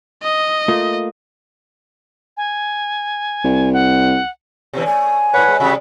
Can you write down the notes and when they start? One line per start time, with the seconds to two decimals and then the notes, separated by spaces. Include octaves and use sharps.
0.23 D#5
0.68 A3 A#3 F4
2.37 G#5
3.44 C2
3.73 F#5
4.73 B2 D3 E3
4.87 A3 G#5
5.34 G#2 B4 C#5 F#5
5.48 G#3
5.60 C3 G3 F#4 E5 B5